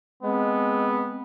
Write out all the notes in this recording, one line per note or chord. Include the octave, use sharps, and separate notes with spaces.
G#3 B3 C4